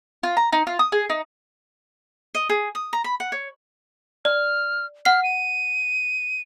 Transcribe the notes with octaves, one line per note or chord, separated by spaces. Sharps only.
F4
A#5
D#4
F4
D#6
G#4
D#4
D#5
G#4
D#6
A#5
B5
F#5
C#5
D5 F6
F#5 F6 C7
D#7